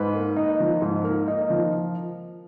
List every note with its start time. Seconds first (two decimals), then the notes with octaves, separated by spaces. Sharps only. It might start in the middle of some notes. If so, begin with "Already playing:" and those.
Already playing: G#2 B4
0.15 A#3
0.37 D#4
0.60 F3
0.82 G#2
1.04 A#3
1.28 D#4
1.50 F3